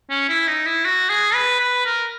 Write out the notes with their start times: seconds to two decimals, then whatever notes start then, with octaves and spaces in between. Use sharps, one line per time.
0.10 C#4
0.29 E4
0.48 D#4
0.66 E4
0.85 F#4
1.10 G#4
1.35 B4
1.60 B4
1.86 A#4